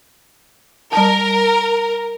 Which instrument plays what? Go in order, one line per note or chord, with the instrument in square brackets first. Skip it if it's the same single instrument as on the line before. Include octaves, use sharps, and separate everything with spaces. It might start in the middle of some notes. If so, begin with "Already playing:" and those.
[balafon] G3 A5 [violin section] A#4